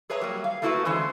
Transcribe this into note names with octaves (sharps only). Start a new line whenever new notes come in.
G#4 B4 C#5 E5 A#5
F#3 G3 A#3
F5
A3 A#3 E4 F#4 A4 B4
D3 E3 G#3 C#4 C5